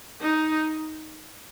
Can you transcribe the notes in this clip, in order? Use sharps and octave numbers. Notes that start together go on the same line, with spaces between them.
D#4